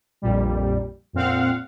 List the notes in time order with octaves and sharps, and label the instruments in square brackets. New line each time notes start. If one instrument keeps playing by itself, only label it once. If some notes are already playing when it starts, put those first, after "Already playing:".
[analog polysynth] A#1 F2 A#2 G3
F2 A#2 C4 F5 F#5